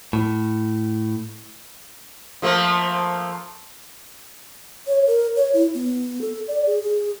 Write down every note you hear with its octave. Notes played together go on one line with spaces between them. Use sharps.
A2
F3 A3 A#3
C#5
A#4
C#5
E4
B3
A4
D5
G#4
G#4